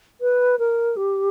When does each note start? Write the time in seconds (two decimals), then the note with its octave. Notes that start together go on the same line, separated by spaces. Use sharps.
0.21 B4
0.59 A#4
0.96 G4